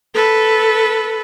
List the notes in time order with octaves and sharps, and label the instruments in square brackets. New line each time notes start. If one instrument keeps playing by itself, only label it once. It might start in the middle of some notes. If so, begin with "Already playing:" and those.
[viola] A4 B4